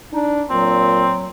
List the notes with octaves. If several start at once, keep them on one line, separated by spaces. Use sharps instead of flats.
D4 D#4
A#2 F#3 C4